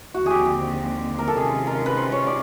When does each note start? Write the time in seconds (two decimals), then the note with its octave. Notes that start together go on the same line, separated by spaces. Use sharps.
0.14 D#2 D3 F3 G#3 C4 F#4
0.26 G4 G#4
0.45 G4
1.19 A#4
1.28 A4
1.36 C3 D#3 G#3 C#4 F4 G#4
1.67 A#4
1.86 B4
1.97 C5
2.12 C#5
2.27 D5